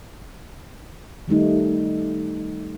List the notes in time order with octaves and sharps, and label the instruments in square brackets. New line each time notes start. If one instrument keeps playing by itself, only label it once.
[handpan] D#3 G3 A3 D#4